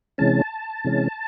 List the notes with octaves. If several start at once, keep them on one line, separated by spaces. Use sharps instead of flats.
C3 E3 G#3 C#4 A5
C3 E3 G#3 C#4